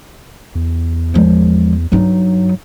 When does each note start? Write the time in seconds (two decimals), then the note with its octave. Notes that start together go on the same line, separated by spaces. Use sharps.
0.55 E2
1.14 F3 G#3
1.92 G2 F#3 D#4